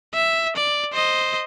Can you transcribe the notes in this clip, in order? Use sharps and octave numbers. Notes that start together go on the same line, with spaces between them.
E5
D5
C5 D#5